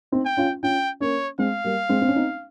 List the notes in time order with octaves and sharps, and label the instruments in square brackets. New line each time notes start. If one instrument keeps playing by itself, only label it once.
[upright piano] C4 D#4
[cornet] G5
[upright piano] C#4 F4
[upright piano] C#4 F4 [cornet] G5
[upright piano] A#3 C#4 [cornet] C#5
[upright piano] G#3 C4 [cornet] F5
[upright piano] G3 A#3
G#3 C4
C4
C#4
C4 D#4